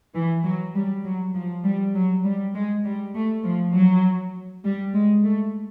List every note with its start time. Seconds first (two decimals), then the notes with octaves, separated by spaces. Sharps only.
0.15 E3
0.44 F#3
0.75 G3
1.04 F#3
1.35 F3
1.64 G3
1.94 F#3
2.24 G3
2.55 G#3
2.85 G3
3.15 A3
3.44 F3
3.74 F#3
4.64 G3
4.94 G#3
5.24 A3